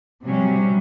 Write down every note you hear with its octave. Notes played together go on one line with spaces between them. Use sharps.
C3 F#3 G3 C#4